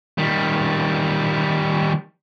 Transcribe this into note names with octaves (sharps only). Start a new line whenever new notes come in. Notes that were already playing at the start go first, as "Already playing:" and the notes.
D#3 G3